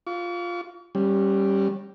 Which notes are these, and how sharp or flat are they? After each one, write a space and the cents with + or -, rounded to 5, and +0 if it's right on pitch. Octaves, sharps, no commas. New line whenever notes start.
F4 +0 C#6 +45
G3 +0 C#4 -25